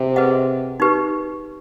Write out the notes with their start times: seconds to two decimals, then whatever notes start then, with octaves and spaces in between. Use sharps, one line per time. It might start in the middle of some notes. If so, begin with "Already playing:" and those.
Already playing: C3
0.16 G#4 B4 D#5 F#5
0.80 D#4 G4 B4